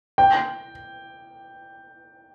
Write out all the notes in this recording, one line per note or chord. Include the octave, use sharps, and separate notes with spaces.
G5